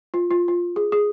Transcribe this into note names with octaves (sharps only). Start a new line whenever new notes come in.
F4
F4
F4
G#4
G#4